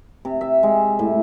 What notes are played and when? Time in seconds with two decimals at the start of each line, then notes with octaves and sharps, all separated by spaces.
0.25 C3
0.41 E5
0.63 G#3
0.99 A2